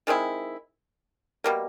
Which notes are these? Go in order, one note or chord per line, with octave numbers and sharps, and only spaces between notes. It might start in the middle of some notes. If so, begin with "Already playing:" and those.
D#3 G#3 C4 E4
B2 G3 A#3